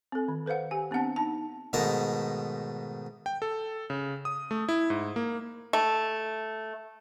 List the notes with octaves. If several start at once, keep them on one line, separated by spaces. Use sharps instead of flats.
C4 A4
D#3
A4 B4 C5 F5 F#5
G4 G#5
B3 C4 D4 F#5 A5
D#4 A5
G#2 B2 D#3 A3 A5 A#5
G5
A4
C#3
D#6
A3
E4
G#2
A#3
A3